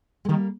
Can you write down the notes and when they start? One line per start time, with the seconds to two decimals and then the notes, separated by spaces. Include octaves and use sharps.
0.25 G#3
0.29 D#3 G3 A#3